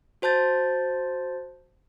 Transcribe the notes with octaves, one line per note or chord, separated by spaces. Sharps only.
F#4 C5 A5 G6 A6